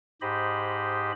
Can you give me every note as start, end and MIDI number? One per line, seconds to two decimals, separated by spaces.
0.22 1.12 44
0.22 1.12 67
0.22 1.12 72
0.22 1.12 75
0.22 1.12 83